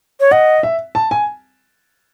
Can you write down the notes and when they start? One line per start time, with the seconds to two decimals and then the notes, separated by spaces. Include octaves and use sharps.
0.20 C#5
0.31 D#5 F#5
0.63 E5
0.95 A5
1.11 G#5